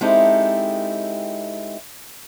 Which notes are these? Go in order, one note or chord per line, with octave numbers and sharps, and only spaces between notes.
G#3 C4 D#4 E4 G4 A4